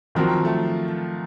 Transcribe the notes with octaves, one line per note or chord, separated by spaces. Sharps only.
D#3 F3 F#3 C4 F#4 A#4
A3